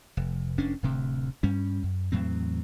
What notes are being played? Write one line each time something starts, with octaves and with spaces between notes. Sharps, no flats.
F1
F1 C#4 D4
D1 D2 C3
G2 G3 C#4
F#2
E2 A2 F#3 C4